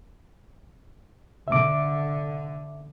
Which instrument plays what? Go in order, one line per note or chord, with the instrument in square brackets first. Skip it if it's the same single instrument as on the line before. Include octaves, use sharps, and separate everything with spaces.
[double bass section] D3 [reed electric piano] E5 D6